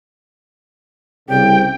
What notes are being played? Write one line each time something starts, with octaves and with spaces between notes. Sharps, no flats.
C2 C#3 G5